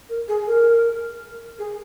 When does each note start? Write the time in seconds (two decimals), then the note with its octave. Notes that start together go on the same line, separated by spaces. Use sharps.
0.09 A#4
0.28 G#4
0.47 A#4
1.59 G#4